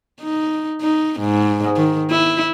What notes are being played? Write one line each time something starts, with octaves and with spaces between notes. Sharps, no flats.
D#4
D#4
G#2
D#3
E4